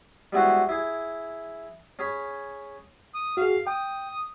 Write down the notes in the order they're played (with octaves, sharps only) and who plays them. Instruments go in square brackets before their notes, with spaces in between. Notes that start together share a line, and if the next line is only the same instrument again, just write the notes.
[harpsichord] G3 G#3 B3 E4 F#4 C5
E4 G#4
C#4 G#4 B5
[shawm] D#6
[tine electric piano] F#4 G#4 [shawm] F5
[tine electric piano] G5 [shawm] D#6